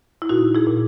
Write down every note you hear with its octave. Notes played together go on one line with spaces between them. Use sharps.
E4
A#2 D#4 F#4
E4 G#4
A#2